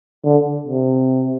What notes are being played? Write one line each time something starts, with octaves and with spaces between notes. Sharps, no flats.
D3
C3